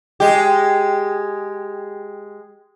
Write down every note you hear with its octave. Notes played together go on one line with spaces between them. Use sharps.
G#3 G4